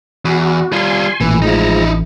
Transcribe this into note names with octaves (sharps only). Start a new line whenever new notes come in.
E2 F#4
G3 F4 G#5 C6
A1 A#2 E3
F3 G#3 D#4 E4 A#5